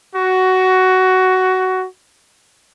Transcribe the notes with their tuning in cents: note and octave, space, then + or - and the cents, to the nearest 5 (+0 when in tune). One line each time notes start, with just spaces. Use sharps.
F#4 +10